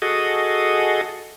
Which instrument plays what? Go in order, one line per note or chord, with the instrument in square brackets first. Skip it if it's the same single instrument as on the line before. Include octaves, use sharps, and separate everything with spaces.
[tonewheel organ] F#4 G#4 A4 D#5